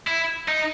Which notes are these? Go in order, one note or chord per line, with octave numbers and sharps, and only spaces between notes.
E4
D#4